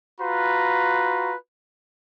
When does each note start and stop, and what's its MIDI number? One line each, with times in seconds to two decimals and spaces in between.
0.21 1.35 65
0.21 1.35 66
0.21 1.35 71
0.21 1.35 82